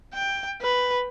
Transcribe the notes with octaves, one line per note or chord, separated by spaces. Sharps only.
G5
B4